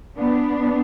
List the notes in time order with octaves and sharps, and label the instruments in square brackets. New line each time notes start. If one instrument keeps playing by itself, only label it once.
[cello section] B3 D4